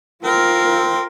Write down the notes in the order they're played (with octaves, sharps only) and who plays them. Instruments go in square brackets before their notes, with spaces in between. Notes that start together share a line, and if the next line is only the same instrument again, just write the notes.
[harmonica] C4 [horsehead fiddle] F4 A#4